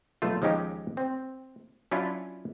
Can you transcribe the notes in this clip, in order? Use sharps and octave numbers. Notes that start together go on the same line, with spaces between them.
B1 A3 F4
D#2 F3 G#3 C#4 D#4 G4
C4
F#3 C#4 D4 E4 F4